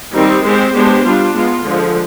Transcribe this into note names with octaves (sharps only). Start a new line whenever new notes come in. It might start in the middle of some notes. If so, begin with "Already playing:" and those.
D#3 G3 C4 D#4
G#3 C4 G4 C5
G#3 B3 D4 G4 C5
G3 D4 F4
G#3 B3 F4
D3 F3 G#3